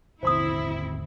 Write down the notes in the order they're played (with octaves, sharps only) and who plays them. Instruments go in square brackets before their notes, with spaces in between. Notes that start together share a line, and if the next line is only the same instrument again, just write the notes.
[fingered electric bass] G#1 D#2 D3 [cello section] C4 E4 [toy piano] C5 C6 D#6